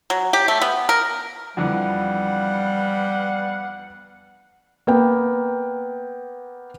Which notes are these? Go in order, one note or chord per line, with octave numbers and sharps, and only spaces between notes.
F#3
G4
A3
B3
A#4
F2 D3 E3 G3 B3 F5 F#5
A#3 B3 G5